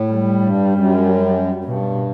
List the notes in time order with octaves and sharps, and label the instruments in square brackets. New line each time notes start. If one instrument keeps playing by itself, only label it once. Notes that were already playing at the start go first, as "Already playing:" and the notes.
Already playing: [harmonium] A2
[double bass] G3
[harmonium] G2
F#2
F#2
[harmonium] G2 [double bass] B2